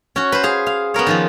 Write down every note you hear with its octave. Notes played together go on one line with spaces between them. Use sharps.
C#4 F#4
B4 C5
G#4 F5
F5
B3 C#4 A#4 C#5
D#3 F3 F4